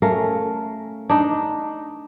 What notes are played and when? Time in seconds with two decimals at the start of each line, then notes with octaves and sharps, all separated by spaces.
0.02 A3 C#4 A#4 F5
1.10 D4 D#4